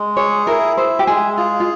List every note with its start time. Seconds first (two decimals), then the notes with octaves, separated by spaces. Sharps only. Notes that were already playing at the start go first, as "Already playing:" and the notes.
Already playing: G#3
0.17 G#4 C#5
0.47 E4 A#4
0.77 C5 E5
0.99 G4
1.07 G#3 G#4
1.37 F4 G#4
1.60 F4